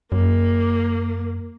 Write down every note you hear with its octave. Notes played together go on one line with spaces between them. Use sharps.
F#2 A#3